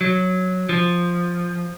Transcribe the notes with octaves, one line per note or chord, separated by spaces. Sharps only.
F#3
F3